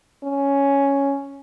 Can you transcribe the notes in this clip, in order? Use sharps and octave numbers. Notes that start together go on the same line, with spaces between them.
C#4